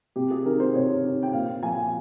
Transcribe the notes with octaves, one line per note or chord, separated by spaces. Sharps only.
C3 G4
G#4
D#3 A#4
C5
C3 C#5
D#3
G5
A#2 F5
F3 G#5